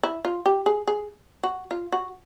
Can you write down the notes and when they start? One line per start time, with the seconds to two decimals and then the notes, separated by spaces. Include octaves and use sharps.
0.03 E4
0.25 F4
0.46 G4
0.66 G#4
0.87 G#4
1.43 F#4
1.71 F4
1.92 F#4